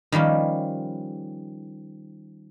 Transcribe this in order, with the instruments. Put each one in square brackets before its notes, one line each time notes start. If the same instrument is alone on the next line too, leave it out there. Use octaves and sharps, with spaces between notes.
[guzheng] D#3 F3 G3 C#4